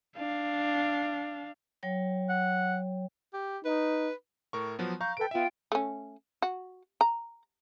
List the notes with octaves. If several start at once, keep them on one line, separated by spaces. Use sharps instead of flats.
D4 F5
F#3 C#5 G5
F#5
G4
D#4 B4
A2 A#4 C#6
F3 F#3 B3
F5 A#5 C#6 G6
A4 B4 G5 D7
B3 F4 E5 G5
A3 C#4
F#4
A#5